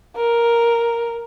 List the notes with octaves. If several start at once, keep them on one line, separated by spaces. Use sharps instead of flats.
A#4